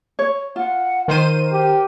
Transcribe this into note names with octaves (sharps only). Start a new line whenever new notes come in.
C#5
F4 F#5
D#3 A#4 C5 D#7
G4